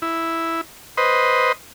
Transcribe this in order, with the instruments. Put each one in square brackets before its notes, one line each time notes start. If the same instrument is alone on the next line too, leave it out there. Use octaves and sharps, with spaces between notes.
[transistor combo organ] E4
B4 C5 D#5